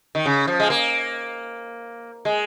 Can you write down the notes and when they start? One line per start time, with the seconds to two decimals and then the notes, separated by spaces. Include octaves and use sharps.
0.15 D#3
0.25 C#3
0.47 F3
0.60 G#3
0.70 A#3
2.25 G#3